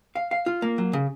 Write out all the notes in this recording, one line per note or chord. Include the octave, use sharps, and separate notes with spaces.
F5
F5
F4
A#3
F#3
C#3